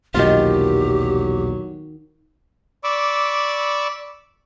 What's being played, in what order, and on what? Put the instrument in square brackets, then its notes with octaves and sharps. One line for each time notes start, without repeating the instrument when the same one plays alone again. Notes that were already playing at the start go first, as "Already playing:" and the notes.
[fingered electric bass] B1 E2 A#2 [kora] D#3 F4 [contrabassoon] F#3 [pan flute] G4
[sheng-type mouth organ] D5 B5 C#6 D6 E6